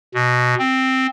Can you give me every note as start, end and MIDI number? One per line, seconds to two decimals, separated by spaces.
0.14 0.55 47
0.59 1.07 60